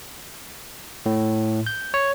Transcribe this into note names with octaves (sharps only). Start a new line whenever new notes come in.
A2
G6
C#5